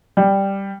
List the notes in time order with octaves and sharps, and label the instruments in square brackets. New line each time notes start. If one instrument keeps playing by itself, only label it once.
[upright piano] G3